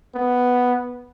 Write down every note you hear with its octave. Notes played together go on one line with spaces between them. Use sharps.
B3